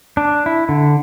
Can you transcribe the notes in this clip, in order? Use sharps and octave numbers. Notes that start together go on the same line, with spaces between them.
D4
E4
D3